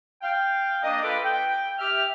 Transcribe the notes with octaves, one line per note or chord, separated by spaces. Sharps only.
F5 G5
A#3 D4 D#5
F4 A4 B4 D6
G5
G4 E5 F6